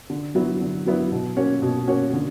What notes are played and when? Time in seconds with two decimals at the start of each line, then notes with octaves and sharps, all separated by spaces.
0.10 D3
0.35 F#3 B3 E4
0.61 D3
0.86 F#3 B3 E4
1.12 B2
1.36 A#3 C#4 F#4 C#5
1.62 B2
1.87 A#3 C#4 F#4 C#5
2.13 D3